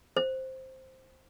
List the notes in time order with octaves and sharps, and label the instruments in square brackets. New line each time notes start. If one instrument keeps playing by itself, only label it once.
[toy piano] C5